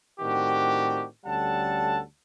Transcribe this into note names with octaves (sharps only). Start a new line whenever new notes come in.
A2 D#3 C4 D4 F#4 G4
D2 G3 C#4 A4 F#5 A5